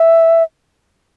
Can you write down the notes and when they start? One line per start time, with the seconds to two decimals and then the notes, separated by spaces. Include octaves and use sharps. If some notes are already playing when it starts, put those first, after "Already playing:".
Already playing: E5